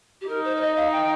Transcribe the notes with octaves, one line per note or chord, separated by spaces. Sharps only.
G4
D#4 A#4
C5
C5
D#5
F5
G5